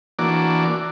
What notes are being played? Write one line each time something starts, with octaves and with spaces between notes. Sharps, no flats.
E3 A#3 D4 F#4 D5